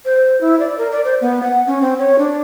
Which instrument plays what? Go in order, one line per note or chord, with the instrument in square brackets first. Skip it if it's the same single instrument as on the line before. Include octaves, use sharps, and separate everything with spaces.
[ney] C5
E4
D5
A#4
D5
C5
B3
F#5
C#4
C4
C#5
D4